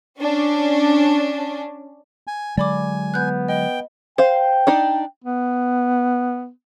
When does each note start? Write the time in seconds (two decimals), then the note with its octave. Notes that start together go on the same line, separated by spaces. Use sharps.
0.20 C#4 D4
2.27 G#5
2.57 D3 F#3 G#3 D5 G#5 B5 D6
3.14 B3 F#6 G6
3.49 D#5 G5
4.18 C5 F5 G5
4.67 D4 D#4 D5
5.24 B3